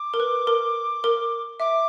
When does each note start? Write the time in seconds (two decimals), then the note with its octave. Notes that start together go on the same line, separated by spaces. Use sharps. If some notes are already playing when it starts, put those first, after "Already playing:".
Already playing: D6
0.14 A#4
0.20 B4
0.47 A#4
1.04 A#4
1.60 E5 D6